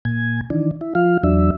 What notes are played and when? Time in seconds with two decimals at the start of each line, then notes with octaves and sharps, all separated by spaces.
0.05 A#2 G#5
0.50 D#3 E3 D4
0.81 E4
0.95 F3 F4 F5
1.23 E2 F#3 D4 E5